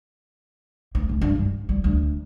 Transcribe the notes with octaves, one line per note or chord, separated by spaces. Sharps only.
A#3
C#2
G2
G#2
G3
D2